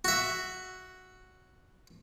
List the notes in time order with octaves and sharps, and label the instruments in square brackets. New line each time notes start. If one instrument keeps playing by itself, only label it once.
[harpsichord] F#4 E5